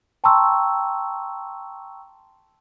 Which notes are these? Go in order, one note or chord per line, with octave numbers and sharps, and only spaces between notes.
G5 A5 A#5 C6 C#6 E6